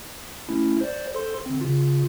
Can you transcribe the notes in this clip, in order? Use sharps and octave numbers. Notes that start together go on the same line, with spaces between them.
A3 C#4 E4
C5 D5
A4 C5 C6
D3 C4
C#3 F4